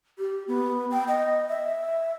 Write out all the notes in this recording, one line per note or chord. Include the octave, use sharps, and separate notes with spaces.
G4
B3
G5
D#5
E5